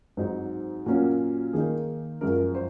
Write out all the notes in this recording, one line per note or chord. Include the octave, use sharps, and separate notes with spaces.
G#2 F#3 C4 D#4
A#2 F#3 A#3 C#4 F#4
D#3 A#3 D#4 G#4
F#2 F3 G#3 A#4
C5